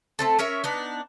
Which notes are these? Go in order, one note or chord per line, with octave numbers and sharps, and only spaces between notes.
A3 C4 A4
C#4 A#4 C#5 E5
B3 D4 D#4